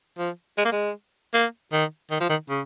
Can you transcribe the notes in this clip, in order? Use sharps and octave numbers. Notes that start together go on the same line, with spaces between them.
F3
G#3
A#3
G#3
A#3
D#3
D#3
F3
D#3
C#3